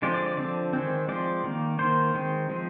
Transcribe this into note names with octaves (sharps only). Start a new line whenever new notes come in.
D3 F3 G#3 C4 D5
D5
D5
D3 F3 C4 D5
D#3 G#3 C4
F3 G#3 C4 D5
D#3 A#3
D#3 A#3 C5
D#3 G#3 C4
F3 G#3 C4